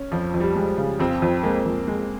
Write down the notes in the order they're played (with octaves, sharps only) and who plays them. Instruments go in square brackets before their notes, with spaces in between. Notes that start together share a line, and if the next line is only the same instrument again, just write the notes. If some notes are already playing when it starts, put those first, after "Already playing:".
Already playing: [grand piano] C#4
[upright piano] F2 [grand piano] F3
[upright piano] F2
[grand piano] G3
[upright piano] G#3
C#3
[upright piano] F2 [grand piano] C4
[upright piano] F2
[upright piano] G#3 [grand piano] A#3
[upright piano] F2
G#3